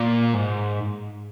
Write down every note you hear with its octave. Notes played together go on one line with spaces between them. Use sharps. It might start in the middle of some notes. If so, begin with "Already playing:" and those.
Already playing: A#2
G#2